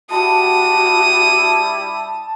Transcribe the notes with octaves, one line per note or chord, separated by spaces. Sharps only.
G3 E4 F#4 A5 D#6